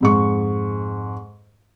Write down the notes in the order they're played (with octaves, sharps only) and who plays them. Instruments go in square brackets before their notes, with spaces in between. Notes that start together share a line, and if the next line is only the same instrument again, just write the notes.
[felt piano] F2 G#2 C#6